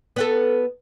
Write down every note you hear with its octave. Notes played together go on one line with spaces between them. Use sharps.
B3 F#4 A4